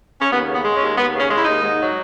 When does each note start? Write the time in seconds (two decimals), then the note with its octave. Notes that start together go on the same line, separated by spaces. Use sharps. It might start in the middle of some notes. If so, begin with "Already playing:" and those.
0.20 C#4
0.31 D#2 B3
0.48 C#3
0.54 B3
0.64 G#3
0.76 C#4
0.81 D#2
0.98 D#2 B3
1.14 C#3
1.20 C#4
1.31 G#3
1.37 E4
1.42 D#2 D#4
1.63 G#2
1.81 F#3